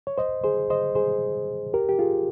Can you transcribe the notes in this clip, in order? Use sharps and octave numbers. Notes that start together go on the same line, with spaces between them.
C#5
C5 D#5
G#4 C5
C5 D#5
G#4 C5
G4 A#4
G4
F4 G#4